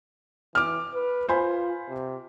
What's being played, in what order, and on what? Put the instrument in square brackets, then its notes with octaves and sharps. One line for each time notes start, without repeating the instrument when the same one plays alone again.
[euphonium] E3 [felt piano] D6 F6
[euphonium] B4
[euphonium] F4 [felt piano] C5 G#5 B5
[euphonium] C3